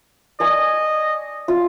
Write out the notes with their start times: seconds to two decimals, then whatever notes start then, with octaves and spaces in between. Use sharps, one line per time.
0.40 D5 D#5 G#5 C#6
1.48 F4